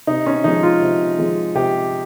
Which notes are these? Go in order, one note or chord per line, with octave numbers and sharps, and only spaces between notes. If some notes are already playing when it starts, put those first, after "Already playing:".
C3 D#4
C#4
F3 G#3 D#4
F4
C3
F3 G#3
C3 G4